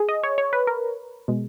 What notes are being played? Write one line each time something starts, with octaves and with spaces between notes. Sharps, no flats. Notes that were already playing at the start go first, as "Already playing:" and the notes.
Already playing: G#4
D#5
C#5
C#5
B4
A#4
B2 G#3